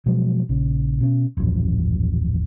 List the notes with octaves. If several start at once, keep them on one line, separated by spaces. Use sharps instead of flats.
B2 F3 F#3 G#3
A#1 C#3
B2 C#4
D#1 A1 F#2 F3